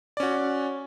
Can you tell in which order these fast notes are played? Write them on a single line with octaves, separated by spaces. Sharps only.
D5 C#4 F#4